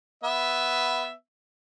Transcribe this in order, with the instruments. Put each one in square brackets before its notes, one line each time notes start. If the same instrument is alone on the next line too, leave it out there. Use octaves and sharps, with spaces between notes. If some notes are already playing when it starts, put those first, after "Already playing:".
[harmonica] B3 E5